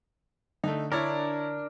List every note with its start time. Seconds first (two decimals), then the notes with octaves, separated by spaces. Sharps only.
0.64 D3 A3 D#4
0.92 D4 E4 A#4 C#5 D5